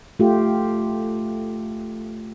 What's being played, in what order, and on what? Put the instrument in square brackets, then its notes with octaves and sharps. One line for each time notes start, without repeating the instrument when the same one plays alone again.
[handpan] A3 F4 G4